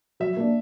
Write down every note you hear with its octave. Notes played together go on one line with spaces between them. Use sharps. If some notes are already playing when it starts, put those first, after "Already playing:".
F#3 E5
A#3 D4